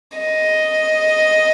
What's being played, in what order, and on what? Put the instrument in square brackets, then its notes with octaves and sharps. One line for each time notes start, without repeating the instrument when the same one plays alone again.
[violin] D#5